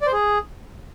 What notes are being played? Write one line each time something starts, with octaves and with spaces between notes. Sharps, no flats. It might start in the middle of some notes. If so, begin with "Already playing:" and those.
D5
C5
G#4